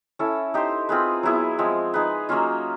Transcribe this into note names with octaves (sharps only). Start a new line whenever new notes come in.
C#4 E4 A4
D#4 G4 C5
C4 F4 G#4 B4
F#3 B3 E4 G#4
F3 G#3 C4
D#4 G#4 B4
F#3 A#3 C#4 F4